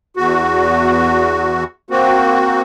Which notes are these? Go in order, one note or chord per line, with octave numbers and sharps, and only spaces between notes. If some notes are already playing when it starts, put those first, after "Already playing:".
E2 F#4
A#3 C4 F#4